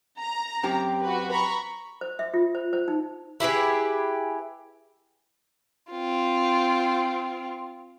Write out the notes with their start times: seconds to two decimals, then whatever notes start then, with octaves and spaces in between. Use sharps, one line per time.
0.19 A#5
0.63 F#2 C4 G4
1.02 F#4 B4
1.31 A#5 B5 C#6
2.01 C5
2.19 E5
2.34 F4
2.55 C5
2.73 C5
2.88 D#4
3.40 E4 G4 G#4 B4
5.91 C4 F4